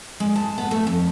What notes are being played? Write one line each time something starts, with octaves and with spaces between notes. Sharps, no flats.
G#3
A5
B3
A3
F2